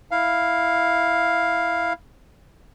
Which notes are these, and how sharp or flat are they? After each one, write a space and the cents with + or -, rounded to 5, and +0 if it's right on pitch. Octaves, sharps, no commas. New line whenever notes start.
E4 -5 F5 +0